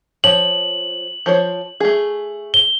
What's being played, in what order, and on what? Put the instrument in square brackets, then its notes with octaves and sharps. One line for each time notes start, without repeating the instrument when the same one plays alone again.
[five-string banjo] F3 C#5 [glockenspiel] F#7
[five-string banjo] F3 C5 C#5
A3 G#4
[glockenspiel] G7